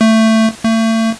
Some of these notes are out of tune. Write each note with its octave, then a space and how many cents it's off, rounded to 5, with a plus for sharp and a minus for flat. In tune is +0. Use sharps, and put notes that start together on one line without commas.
A3 +15
A3 +35